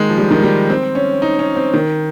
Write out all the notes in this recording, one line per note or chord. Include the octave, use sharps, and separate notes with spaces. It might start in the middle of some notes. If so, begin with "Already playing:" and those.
Already playing: D#3 G#3
F3
G3
D#3
G3
C4
C#4
D#4
C#4
C4
D#3